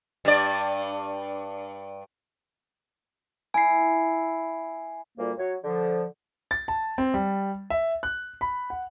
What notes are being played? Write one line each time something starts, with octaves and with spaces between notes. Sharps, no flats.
G2 D5
E4 G#5 C7
D2 A#2 G3 A#3
F#3 C#5
D3 F3
A6
A5
C4
G3
E5
F#6
B5
F#5